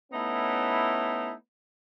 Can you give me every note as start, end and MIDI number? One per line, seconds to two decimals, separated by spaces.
0.12 1.32 57
0.12 1.32 59
0.12 1.32 61
0.12 1.32 63
0.12 1.32 64